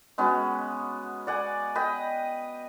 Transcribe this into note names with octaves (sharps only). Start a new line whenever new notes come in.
G#3 B3 C#4 F#4
D5 F#5 G#5
B4 D#5 G5